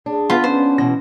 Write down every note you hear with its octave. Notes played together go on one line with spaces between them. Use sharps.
D4 G#4
B3 F4 B5
C#4 C5
B2 E3 A#6